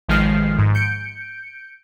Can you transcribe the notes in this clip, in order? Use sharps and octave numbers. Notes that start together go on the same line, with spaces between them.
A1 D#3 F3 G#3 F6 C7
G#2
G6 C#7 D7